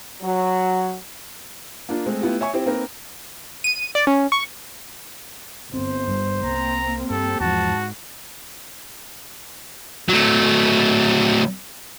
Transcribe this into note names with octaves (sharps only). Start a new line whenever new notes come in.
F#3
A#3 D4 F4
G#3 A3 C4
A3 B3 E4 F4 G4
C#5 E5 G#5 C#6
C4 E4 G4
A#3 C4 D#4 A#4 B4
D#7
D5
C#4
C#6
G1 C4 C5
G2 G3
C2 A#3 C4 A#5
G2 G4 A4
E2 G#2 F3 F#4 A5
F#3 A3